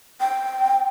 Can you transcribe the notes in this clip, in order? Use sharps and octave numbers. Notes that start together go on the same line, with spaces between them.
G5